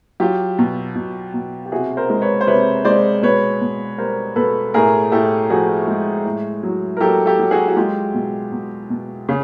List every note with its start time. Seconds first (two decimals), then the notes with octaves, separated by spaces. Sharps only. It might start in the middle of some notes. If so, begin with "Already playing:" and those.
0.20 F#3 F4 G4
0.59 B2
0.95 B2
1.34 B2
1.66 G4
1.72 C3 F#4 G#4
1.97 A#4 C5
2.10 G#3
2.22 B4 C#5
2.41 C5
2.47 C3 B4 C#5
2.85 G#3 C5 D5
3.22 B2 B4 C#5
3.61 B2
3.98 G3 A#4 C5
4.36 B2 A4 B4
4.74 A2 G#4 A#4
5.12 A2 G4 A4
5.50 F3 F#4 G#4
5.87 G#3
6.25 A2
6.63 F#3
6.97 A#4
7.01 F#3 G4 A4
7.26 G4 A4
7.39 F#3
7.51 F#4 G#4
7.68 F#4
7.76 G#3 F4 G4
8.14 B2
8.52 B2
8.90 B2
9.29 C#3